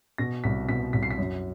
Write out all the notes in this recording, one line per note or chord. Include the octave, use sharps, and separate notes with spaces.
B2 A#6
C2 B6
B2 B6
C2 B6
C7
B6
F#2